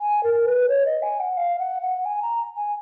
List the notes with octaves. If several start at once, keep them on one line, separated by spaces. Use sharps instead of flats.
G#5
A#4
B4
C#5
D#5
G#5
F#5
F5
F#5
F#5
G#5
A#5
G#5